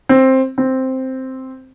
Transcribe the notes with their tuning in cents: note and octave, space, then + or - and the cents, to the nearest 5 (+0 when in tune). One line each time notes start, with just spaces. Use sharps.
C4 +10
C4 +0